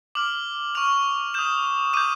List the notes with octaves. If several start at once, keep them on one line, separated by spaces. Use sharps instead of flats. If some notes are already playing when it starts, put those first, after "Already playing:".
D6 F6 F#7
C#6 F6 F7
D#6 G6 E7
D6 G6 D#7